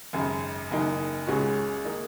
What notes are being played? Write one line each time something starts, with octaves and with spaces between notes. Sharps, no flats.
G#1 F#2 C#3
F#1 F#2 D#3 A#3 D#4
C#2 C#3 G#3 C#4 F#4
D#3 A#3 D#4